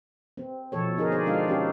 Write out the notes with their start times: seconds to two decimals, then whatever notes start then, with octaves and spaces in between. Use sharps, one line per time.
0.37 C4
0.72 B2 F3 A4 C#5
0.97 D3 D#4 G#4 A#4
1.12 C4 G#4 C5 D5
1.26 G#3 D4 D#4 F4 F5
1.48 C#4 G4 A4